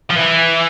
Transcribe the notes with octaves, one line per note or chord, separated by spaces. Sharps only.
F3
E3